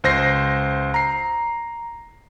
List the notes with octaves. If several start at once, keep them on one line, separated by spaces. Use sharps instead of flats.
C#2 C5 A#6 C7
A#5 C7